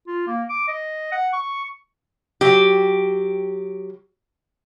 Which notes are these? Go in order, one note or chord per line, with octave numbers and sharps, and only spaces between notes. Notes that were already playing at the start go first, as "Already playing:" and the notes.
F4
A#3
D6
D#5
F#5
C#6
F#3 G4